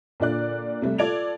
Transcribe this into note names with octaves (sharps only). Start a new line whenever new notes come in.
A#2 D3 F4 D5 F#6
C3 G3 A3
F4 A4 D5 G#6 D7 F7